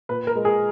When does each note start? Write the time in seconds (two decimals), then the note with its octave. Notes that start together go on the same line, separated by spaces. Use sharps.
0.09 A#2 B4
0.27 A#4
0.35 G#3
0.45 G#4